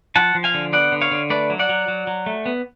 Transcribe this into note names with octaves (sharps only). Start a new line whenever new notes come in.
F3 F#5 A5
F3
F5 G#5
D3
B3 D5 F#5
D3
C#5 F5
D3
A3 B4 D5
F#3
D5 F#5
F#3
F#3
F#3
A3
B3